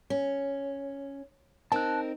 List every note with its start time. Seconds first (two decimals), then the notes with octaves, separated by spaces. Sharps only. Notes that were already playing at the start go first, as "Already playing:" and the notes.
0.10 C#4
1.72 C4 D#4 A#4 A5 F#6